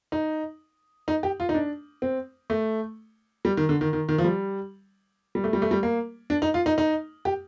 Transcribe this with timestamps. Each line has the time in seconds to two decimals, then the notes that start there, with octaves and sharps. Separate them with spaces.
0.12 D#4
1.08 D#4
1.23 G4
1.40 F4
1.49 D#4
1.54 D4
2.02 C4
2.50 A3
3.45 G3
3.57 D#3
3.69 D3
3.81 D#3
3.93 D#3
4.09 D#3
4.18 F3
4.24 G3
5.35 G3
5.44 A3
5.53 G3
5.62 A3
5.71 G3
5.83 A#3
6.30 D4
6.42 D#4
6.54 F4
6.66 D#4
6.78 D#4
7.25 G4